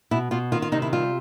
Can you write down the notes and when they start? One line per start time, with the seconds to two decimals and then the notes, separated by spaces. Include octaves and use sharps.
0.11 B2 E4
0.31 B2 F4
0.52 D#3 F4
0.62 F4
0.72 C3 D#4
0.82 E4
0.93 G3 F4